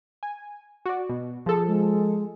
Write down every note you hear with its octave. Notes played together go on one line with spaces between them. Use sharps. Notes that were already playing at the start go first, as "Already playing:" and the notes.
G#5
F#4 D5
B2
F3 G#4 A4
G#3